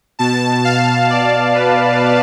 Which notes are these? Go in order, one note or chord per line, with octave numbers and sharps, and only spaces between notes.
B2 A5
F5
D5
B4